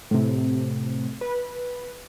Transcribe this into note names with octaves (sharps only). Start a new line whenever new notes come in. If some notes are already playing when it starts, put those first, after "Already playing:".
A2 C3
B4